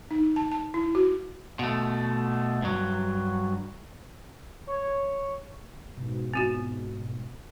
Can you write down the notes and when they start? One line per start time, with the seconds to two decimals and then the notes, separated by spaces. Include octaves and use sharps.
0.11 D#4
0.36 A5
0.52 A5
0.74 E4
0.95 F#4
1.59 B2 A3
2.62 G2 F#3
4.67 C#5
5.97 G#2 B2
6.34 C4 F4 F#4